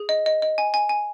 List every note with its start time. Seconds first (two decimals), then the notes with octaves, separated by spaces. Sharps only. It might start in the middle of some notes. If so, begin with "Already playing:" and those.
Already playing: G#4
0.09 D#5
0.26 D#5
0.42 D#5
0.58 G#5
0.74 G#5
0.89 G#5